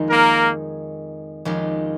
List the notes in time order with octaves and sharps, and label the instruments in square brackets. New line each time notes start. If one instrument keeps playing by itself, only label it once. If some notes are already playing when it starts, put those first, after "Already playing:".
Already playing: [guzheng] F2 D#3 G#3 D#4
[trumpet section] A#3 A#4
[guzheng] F2 D#3 G#3 C#4 G4